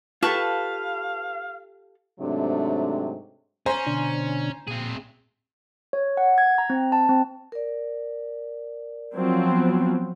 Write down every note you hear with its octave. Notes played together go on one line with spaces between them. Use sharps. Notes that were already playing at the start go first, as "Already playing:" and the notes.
F4 G4 A4 B4 F5 A5 C#6
G#2 C3 F#3 A3 C4 D4
C#4 C5 G#5 A#5
B2 D3 D4
A#2 C4 G#4
C#5
F#5
G#6
A#5
C4
A5
C4
A#4 D5
F3 F#3 C4
B3